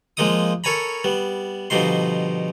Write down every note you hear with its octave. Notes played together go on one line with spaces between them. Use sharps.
F3 G#3 A#3 D#4 D6 D#6
A4 A#4 C#5 G#5 A#5 B5
G3 B3
B2 D3 F3 G3 D#4 C6